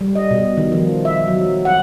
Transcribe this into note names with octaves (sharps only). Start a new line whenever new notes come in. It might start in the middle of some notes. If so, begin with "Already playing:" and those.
G3
D#5
B2
D#3
F3
E5
F#3
F#5